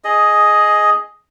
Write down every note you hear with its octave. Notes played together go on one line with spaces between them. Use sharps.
G#4 D#5